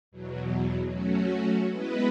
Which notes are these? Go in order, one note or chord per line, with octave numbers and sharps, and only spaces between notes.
E2 B2 F#3
F#3 A3 C#4 F#4
G#3 B3 E4 B4 D#5